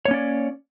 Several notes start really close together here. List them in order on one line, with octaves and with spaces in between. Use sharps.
C#5 A#3 C#4 D5